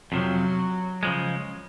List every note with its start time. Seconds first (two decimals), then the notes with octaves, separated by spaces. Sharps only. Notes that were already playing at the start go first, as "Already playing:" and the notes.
0.12 F2 C3 F3 F#3
1.03 C#3 F3 G#3